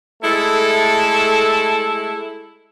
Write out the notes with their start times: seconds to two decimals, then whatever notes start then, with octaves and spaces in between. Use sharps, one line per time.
0.23 G#3 A3 E4 A4